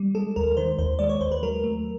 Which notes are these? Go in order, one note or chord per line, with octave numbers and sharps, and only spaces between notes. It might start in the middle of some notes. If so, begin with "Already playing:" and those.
Already playing: G3
G#3 A4
D#2 A#4
D#3 C5
D#2 C5
G#3 D5
C#5
D#2 C5
B4
F#3 A#4
A3